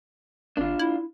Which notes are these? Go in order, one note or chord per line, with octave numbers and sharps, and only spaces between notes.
G#1 D4 F4
E4